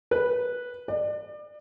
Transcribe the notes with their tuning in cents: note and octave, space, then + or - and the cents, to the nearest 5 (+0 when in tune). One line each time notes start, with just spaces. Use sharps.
B4 -10
D5 +35